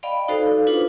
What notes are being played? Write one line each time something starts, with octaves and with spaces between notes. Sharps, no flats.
D5 D#5 F5 G5 B5
D#4 F#4 A4 C5 F5
D4 F4 B4